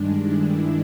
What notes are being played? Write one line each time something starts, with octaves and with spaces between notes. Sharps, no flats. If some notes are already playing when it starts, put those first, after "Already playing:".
Already playing: G2 D#3 G#3 D4
E4